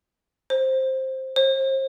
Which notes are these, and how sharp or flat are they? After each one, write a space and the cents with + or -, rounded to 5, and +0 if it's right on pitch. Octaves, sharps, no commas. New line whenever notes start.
C5 +10
C5 +35